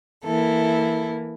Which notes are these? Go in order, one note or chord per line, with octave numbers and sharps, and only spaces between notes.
E3 A#3 E4 A4